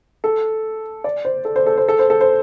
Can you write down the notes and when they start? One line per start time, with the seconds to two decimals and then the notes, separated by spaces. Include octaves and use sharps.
0.24 A4
1.04 D5
1.25 C5
1.45 A4
1.56 C5
1.66 A4
1.77 C5
1.88 A4
1.99 C5
2.10 A4
2.21 C5